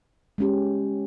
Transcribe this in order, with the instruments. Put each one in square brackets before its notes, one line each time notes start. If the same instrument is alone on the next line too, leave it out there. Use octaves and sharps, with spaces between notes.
[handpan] G#3 C#4 G4